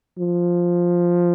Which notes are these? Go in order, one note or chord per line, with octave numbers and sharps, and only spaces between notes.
F3